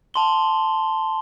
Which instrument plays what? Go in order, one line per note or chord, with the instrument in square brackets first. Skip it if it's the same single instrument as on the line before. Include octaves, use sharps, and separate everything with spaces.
[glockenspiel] A5 C6 G7